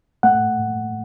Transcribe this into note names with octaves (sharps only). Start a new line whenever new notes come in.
A3 F#5